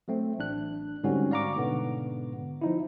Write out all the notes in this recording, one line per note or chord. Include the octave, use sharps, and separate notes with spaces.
F#3 A3 C4
A1 D4 F#6
G#2 D3 G3 C4 C#4 F#4
D5 F5 A#5 C#6 D6
G#2 B2 D3 B3
F3 D#4 E4